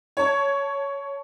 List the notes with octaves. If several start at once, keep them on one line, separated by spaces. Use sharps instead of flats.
C#5 A5